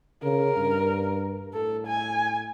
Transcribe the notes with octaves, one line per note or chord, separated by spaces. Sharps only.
C#3 A#4
G2
A2 A4
G#5